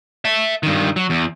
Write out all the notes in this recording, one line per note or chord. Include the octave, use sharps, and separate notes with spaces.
E5 A5
G2 D#3
F#3
E2